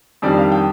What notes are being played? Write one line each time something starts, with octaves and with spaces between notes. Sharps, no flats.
F2 D#3 G3 D4 D5
F5
G5